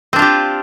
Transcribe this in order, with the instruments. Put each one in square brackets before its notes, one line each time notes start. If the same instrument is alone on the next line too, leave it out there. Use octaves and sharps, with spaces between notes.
[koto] C4
D4
F4
G4